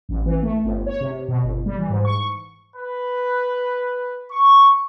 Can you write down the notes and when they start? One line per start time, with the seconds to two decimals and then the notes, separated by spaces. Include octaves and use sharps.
0.09 A1
0.26 E3
0.43 A3
0.64 G1
0.87 C#5
1.01 C3
1.28 B2
1.43 G1
1.66 G3
1.78 E3
1.90 G#2
2.05 C#6
2.77 B4
4.32 C#6